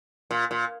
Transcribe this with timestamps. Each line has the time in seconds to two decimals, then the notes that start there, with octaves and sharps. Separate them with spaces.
0.31 A#2
0.51 A#2